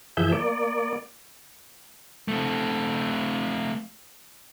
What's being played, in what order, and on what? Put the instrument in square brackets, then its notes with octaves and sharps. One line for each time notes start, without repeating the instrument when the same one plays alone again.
[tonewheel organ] F#2 E3 F3 G#4 E5 G6
A#3 D5
[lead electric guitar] A3 C4